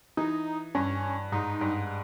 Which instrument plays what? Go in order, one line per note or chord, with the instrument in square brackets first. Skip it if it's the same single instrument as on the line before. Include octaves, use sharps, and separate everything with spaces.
[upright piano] E3 [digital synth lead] D#4
[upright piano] G2 [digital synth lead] C#4
[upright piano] G#2 [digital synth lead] D#4
[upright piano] G2